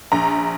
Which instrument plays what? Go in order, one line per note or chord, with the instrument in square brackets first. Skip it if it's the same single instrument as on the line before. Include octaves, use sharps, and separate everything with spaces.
[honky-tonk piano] A#1 A#5